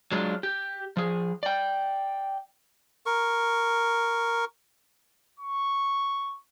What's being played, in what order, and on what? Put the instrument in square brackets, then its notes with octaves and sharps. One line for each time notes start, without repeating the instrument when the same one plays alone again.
[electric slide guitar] F#3 G#3 D4 D#4 F4
G4
F3 G#4
D5 G5
[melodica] A#4 C#6
[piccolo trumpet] C#6